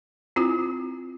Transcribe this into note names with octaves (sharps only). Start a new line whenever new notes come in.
C4 E4 F4